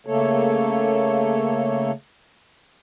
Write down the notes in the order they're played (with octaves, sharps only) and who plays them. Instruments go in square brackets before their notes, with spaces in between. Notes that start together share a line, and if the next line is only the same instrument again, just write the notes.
[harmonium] C#3 A3 A#3 A4 C#5